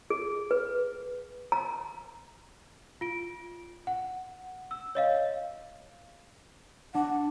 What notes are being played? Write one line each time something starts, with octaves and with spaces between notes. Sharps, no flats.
G#4
B4
A#5
F4 D7
F#5
E6
C#5 D#5 F5
D4 F#5